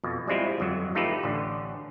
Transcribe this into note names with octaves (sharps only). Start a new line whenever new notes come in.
F2 B2
G3 G#3 C4 E4 F4
G1 F2 F#3
A3 D#4 F4 G4 A4 B4
A1 D3